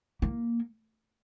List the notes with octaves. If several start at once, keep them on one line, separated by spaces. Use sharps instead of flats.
A#3